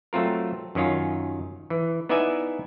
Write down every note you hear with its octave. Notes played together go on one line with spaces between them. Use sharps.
F#3 A3 C4 F4 A#4
F#2 D#3 C#4 F4
E3
B3 D#4 E4 D5 E5 G#5